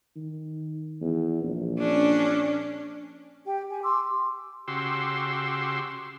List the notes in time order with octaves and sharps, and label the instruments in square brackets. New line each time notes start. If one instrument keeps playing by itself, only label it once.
[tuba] D#3
E2
A#1
[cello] C#4 D4
[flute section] G4 G5
G4 G#5
C6 D6 E6
[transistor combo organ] C#3 F#4 G4 C6 E6